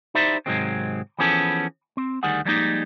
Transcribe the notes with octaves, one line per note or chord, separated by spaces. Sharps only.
D#4 E4 G4 C5 D5 E5
G#2 C3 D#3 F#3 G#3 C4
E3 F3 B3 C#4 G#4 A4
C4
D2 D#3 G3 G#4 F#5
F3 G3 G#3 A#3 C4 D#4